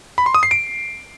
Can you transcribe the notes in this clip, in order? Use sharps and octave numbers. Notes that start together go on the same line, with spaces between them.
B5
C6
D#6
C7
D7